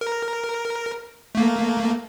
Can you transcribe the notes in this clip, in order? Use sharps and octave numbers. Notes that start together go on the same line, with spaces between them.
A#4
A3 A#3